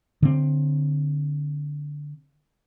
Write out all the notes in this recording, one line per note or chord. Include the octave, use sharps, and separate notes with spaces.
D3 C4